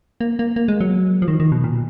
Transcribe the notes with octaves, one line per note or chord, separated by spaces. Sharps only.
A#3
A#3
A#3
G#3
F#3
F3
D#3
D#3
B2
A#2